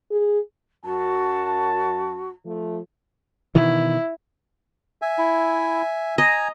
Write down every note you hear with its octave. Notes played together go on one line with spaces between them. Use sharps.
G#4
F#2 F#4 A5
F3 A3
B2 D#3 E3 E4
E5 G#5
E4
D#5 G#5 A#5